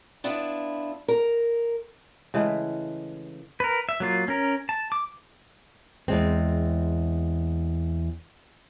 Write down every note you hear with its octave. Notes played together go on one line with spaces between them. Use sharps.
B3 D4 E4 F4
A#4
C#3 E3 G#3 A3
A#4 B4
E5
F#3 A#3 F4
C#4 A#4
A5
D6
E2 G#3 C4